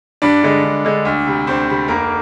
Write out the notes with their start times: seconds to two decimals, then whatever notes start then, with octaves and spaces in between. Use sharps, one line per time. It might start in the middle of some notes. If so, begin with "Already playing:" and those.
0.22 G2 D4 D5
0.43 D3 G#3
0.64 G2
0.85 D3 G#3
1.05 D2
1.26 C3 G3
1.47 D2 C4 C5
1.68 C3 G3
1.88 F1 A#3 A#4